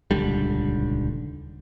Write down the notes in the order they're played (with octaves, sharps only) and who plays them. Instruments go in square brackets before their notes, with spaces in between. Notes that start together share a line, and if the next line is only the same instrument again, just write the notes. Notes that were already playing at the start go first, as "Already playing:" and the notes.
[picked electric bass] D#1 C#2 D3 G3